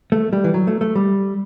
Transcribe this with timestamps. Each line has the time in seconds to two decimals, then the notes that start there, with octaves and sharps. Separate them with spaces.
0.12 A3
0.33 G3
0.44 E3
0.54 F#3
0.67 A3
0.81 A3
0.95 G3